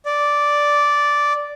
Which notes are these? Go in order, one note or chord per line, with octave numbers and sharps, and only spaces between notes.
D5